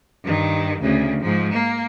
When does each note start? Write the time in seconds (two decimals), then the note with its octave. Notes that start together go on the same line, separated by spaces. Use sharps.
0.24 G2 D#3
0.81 D2 C#3
1.20 G#2 F3
1.52 A#3